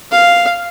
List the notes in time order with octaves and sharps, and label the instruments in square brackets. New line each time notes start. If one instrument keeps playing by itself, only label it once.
[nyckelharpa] F5